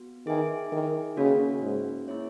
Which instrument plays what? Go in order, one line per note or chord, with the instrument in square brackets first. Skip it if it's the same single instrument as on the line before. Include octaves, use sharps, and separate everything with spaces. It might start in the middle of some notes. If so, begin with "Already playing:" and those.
Already playing: [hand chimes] B3 F#4
[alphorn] D#3 [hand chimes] G#4 B4 E5 G#5
[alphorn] D#3
[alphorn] C#3 [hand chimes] A#3 C#4 F#4 B4
[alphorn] G#2
[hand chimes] A#3 E4 G#4 C#5 E5